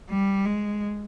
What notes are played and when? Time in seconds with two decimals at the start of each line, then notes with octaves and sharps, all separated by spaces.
0.10 G3
0.46 G#3